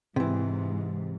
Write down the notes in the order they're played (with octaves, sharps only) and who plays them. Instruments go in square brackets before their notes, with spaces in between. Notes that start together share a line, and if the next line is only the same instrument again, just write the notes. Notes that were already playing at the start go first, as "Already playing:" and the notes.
[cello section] G#2 [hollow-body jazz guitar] C3 E3